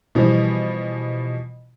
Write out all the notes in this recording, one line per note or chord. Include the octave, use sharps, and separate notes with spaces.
B2 E3 F3 G3